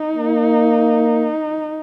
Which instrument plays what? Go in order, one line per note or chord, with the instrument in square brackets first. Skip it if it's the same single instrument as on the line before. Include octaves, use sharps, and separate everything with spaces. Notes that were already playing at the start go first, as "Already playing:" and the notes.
Already playing: [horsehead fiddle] D#4
[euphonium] A#3